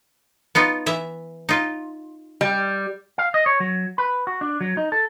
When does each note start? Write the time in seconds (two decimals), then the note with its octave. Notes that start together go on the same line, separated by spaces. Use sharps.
0.55 B3 D#4 F4
0.86 E3 E5
1.49 D#4 F4
2.41 G3
3.18 F5
3.34 D#5
3.46 C#5
3.60 F#3
3.98 B4
4.27 F#4
4.41 D4
4.61 F#3
4.77 D#4
4.92 A4